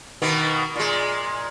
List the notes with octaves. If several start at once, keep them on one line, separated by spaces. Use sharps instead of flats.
B2 D#3 A#3
A#2 G#3